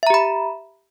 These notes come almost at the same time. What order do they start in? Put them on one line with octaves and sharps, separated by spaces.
E5 A#5 G4 B5